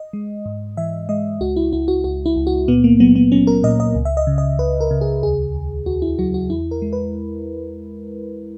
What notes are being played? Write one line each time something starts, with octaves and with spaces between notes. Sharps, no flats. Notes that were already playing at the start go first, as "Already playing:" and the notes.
Already playing: D#5
G#3
G#2
E3 E5
G#3 D#5
C#2 F#4
E4
C#2 E4
F#4
C#2 F#4
E4
C#2
F#4
A#2 B3
A#3
F#3 B3
B3
F#3 C#4
A#4
A#2 D#5
D#5
C#2
E5
D#5
C#3
D#5
C#2 B4
A#4
C#3
G#4
D#2 G#4
D#2
D#2 F#4
E4
F#3 F#4
F#4
E2 E4
A#4
G#3
B4